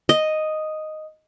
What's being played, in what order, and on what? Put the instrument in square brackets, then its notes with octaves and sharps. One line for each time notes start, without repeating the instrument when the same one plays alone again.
[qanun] D#5